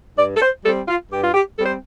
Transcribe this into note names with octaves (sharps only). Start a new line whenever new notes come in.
G2 D5
A4
C5
G3 C4 A4
F4
G2 G4
F4
G4
G3 C4 A4
C5